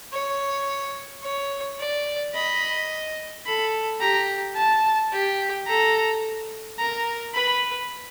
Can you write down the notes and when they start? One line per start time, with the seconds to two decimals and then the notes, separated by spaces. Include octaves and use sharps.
0.13 C#5
1.23 C#5
1.79 D5
2.34 D#5 B5
3.46 A4 B5
4.01 G4 A#5
4.56 A5
5.12 G4
5.67 A4 A#5
6.79 A#4 A#5
7.34 B4 B5